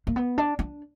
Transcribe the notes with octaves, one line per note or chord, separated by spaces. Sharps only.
A#3
B3
D4
D4